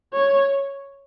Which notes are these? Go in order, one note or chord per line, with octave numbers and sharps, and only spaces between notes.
C#5